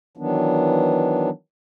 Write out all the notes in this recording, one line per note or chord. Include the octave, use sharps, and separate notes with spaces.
D#3 E3 F#3 B3 D4